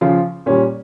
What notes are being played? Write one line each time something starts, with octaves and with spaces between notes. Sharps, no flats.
C#3 F3 F4
A#2 G3 C#4